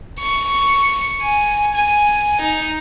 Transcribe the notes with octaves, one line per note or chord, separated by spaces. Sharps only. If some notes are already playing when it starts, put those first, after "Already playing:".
C#6
G#5
G#5
D#4